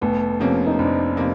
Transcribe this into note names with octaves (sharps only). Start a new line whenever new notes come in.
F1 A3 B3
F2 C3 F3 A#3 B3 C#4
D#4
F1 C4 D4
C3 F3 A#3